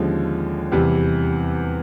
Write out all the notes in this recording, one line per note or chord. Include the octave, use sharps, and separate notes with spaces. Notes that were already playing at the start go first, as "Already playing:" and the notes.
Already playing: D#2 D3 F3 G#3 C#4
E2 C3 E3 G3